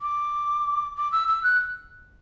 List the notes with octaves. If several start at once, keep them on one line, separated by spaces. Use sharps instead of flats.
D6
D6
E6
E6
F#6